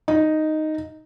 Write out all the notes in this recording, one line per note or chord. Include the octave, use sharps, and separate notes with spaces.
D#4